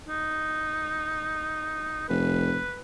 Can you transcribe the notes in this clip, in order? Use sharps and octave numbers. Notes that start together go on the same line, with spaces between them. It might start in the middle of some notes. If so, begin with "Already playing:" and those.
D#4
F1 B4